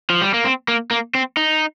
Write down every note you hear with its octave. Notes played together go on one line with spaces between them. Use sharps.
F3
G3
A#3
C4
A#3
A#3
C4
D#4